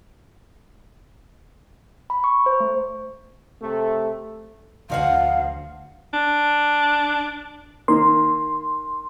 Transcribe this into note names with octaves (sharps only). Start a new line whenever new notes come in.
B5
C#6
C5
A3
C3 A3
D2 F3 F#4 F5 F#5
D4
D#3 A#3 C6